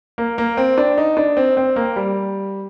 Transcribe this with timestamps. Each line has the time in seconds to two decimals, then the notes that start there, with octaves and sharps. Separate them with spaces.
0.18 A#3
0.38 A#3
0.57 C4
0.78 D4
0.98 D#4
1.17 D4
1.37 C4
1.57 C4
1.76 A#3
1.96 G3